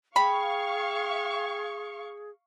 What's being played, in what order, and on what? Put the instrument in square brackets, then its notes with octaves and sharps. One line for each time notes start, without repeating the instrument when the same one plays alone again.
[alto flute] G#4 [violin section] F5 C#6 [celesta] G5 [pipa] B5